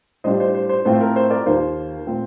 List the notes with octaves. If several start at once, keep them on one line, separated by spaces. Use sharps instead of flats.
A2 G3 D4 F4 C5 D#5
C5
C5
C5
A2 A3 C4 F4 C5
A#4
C5
A#4 D5
D#2 D#3 A#3 F4 C5
A#2 A3 C4 F4